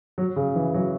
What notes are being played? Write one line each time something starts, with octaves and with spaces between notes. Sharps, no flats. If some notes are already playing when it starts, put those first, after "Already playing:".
F#3
C#3
E3
F#3